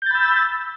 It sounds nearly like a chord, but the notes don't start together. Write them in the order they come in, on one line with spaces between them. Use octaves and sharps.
G6 A6 B5 E6